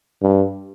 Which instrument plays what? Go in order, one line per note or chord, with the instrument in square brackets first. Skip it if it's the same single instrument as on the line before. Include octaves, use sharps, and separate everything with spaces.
[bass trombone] G2